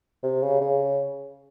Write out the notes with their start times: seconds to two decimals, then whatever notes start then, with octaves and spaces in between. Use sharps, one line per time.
0.23 C3
0.42 C#3
0.61 C#3